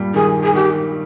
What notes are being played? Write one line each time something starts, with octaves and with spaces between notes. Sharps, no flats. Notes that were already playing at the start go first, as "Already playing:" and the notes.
Already playing: G2 A#2 G3
D#3 G#4
G#4
D#3 G4